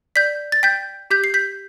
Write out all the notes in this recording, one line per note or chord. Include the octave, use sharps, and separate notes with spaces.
D5 G6 B6
A6
G5 G6 B6
G4 G6 B6
C7
G6 B6